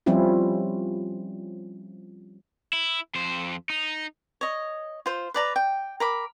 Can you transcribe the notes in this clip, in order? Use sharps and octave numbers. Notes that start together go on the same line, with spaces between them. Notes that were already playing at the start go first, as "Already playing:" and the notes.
F3 G3 C4 C#4 E4 F4
E4
F2 C5
D#4
C#5 D#5
F4 C5
B4 D5 A#5
G5
A#4 B5 D6